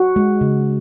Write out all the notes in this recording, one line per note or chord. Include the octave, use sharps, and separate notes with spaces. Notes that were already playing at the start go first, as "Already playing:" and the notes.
Already playing: F#4
G#3
C#3